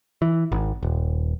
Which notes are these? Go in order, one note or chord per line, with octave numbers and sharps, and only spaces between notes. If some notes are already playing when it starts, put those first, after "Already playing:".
E3
G#1
D#1